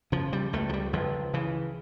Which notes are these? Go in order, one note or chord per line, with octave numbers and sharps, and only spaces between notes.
C#3 F3
G3
C#2 A3
F3
G3
C#2 F3
C#3 E3